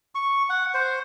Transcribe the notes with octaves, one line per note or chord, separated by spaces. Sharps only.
C#6
F#5
C5